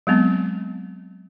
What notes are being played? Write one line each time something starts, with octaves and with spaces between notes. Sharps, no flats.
F#3 G#3 B3 C4